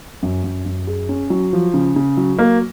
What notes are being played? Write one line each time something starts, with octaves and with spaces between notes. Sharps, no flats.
F#2
F#2
F#2
G#4
C#4
F#3
F3
C#3
C#3
F#3
A#3